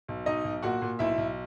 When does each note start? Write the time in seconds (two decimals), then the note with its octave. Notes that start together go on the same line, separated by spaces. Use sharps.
0.08 B1
0.26 B1 D#4 D#5
0.44 B1
0.62 A#2 F#4 F#5
0.82 A#2
0.99 B1 E4 E5
1.18 B1